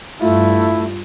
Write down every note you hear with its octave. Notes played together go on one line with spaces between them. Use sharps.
G2 A3 E4 F4